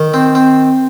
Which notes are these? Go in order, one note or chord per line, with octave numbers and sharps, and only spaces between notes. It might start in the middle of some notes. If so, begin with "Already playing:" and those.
Already playing: D#3
C4
C4